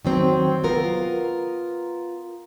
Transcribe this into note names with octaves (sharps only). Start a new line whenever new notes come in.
D#3 F#3 C4
B3 F4 A#4